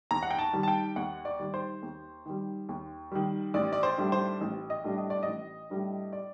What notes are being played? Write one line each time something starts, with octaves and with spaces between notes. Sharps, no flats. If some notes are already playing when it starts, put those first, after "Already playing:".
D#2 A#5
F#5
G5
A5
D#3 G3
A5
G5
D#2 F#5
D5
D#3 G3
C5
D#2
D#3 G3
D#2
D#3 G3
A1 D5
D5
C5
A2 G3 D4
C5
A1
D#5
A2 G3 D4
D#5
D5
A1 D#5
A2 G3 D4
D5